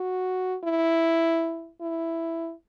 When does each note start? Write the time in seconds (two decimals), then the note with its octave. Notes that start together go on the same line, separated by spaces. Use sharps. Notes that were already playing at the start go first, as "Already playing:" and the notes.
Already playing: F#4
0.64 E4
1.81 E4